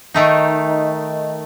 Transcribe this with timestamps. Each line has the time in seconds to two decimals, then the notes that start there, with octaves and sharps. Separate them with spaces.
0.14 D#3 A3 D#4